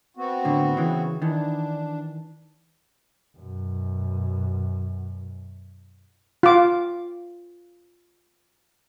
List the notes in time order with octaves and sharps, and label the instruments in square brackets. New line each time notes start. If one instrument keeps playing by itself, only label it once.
[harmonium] B3 C4 F#4
[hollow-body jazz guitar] A2 D3
C#3 E3
[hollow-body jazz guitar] D#3 E3 [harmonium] D4
[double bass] F#2 B2
[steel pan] F4 D6